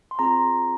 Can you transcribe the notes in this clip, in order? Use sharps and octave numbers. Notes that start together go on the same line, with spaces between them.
C6
C4 F4 G#4 A#5